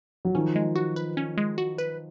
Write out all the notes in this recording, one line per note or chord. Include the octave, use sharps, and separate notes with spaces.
F#3
D#3 F3 C#4
G#3
F#4
B4
C#4
G#3
F#4
B4